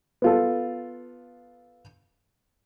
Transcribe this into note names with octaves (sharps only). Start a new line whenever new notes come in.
B3 F4 A4